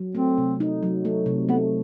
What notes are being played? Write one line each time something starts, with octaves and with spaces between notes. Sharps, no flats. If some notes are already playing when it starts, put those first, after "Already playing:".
Already playing: F#3
A3 C4
C3
D#4
F#3
A3
C3
A3 B3